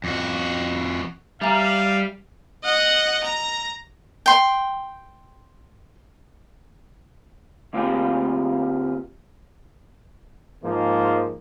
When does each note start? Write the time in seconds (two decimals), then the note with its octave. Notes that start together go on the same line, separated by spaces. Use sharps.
0.04 F2 F#4
1.42 G3 E5 F5 G#5 A#5
2.64 D#5 F#5
3.24 A#5
4.26 G5 C6
7.73 D3 A#3 C4 F4 G4 G#4
10.62 G#2 F3 G#3 A#3